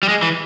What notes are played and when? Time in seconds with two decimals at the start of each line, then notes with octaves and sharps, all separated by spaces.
0.03 G3
0.09 G#3
0.22 E3